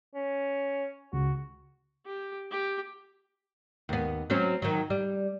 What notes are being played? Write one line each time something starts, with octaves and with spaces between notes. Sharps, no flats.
C#4
C#2 C#3 F#4
G4
G4
D#2 B3
F#3 C4 C#4
D#3 F#3
G3